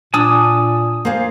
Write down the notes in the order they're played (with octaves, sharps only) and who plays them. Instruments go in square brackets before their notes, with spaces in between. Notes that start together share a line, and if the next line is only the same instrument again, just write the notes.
[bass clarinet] A#2 [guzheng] D4 [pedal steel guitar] G#5 D#6 E6
[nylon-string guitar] A#3 F4 [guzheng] G#4 C5